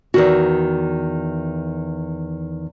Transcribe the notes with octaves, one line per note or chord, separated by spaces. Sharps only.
E2 D#3 F#4